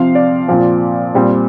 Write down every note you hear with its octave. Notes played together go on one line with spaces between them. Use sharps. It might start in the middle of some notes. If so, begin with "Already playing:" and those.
Already playing: C3 F3 C4 F5
D5
A#2 F3 C4
A#2 G3 C4